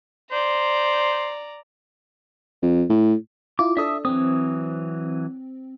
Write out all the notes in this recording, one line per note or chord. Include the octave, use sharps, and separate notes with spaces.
C5 D5 A#5
F2
A2
E4 F4 D6
D4 A4 D5 E5 D#6 E6
E3 F#3 C4 D#6